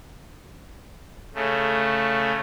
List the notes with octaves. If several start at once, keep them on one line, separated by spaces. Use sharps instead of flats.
C#3 A3